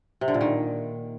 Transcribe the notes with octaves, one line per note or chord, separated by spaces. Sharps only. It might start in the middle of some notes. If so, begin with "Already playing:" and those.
C3
D3
A#2
D#3